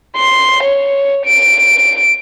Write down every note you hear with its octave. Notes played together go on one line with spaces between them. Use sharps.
C6
C#5
D7